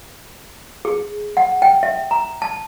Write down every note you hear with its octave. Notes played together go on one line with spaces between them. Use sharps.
G#4
F#5
G5
E5
A#5
A5